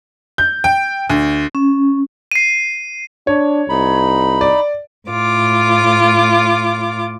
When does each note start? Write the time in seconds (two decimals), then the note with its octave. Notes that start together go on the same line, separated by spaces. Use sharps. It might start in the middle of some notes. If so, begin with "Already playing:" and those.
0.38 G6
0.64 G5
1.10 D2
1.55 C#4
2.32 C7 D#7
3.27 D4 C#5
3.69 C2 D#4 B5
4.41 D5
5.07 A2 F4 D6